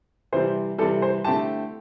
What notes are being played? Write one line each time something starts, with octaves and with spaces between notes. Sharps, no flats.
C3 E3 G3 C5
C3 E3 G3 A4
C5
D3 A3 C4 E4 G4 A5